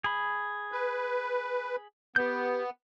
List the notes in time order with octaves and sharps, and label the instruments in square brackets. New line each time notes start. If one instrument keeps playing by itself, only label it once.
[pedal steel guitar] G#4 B5
[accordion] B4
[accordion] B3 [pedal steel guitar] G4 G6